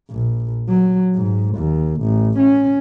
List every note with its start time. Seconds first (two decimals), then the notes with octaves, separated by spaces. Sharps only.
0.10 A#1
0.69 F#3
1.15 G#2
1.56 D#2
2.01 A1
2.39 C#4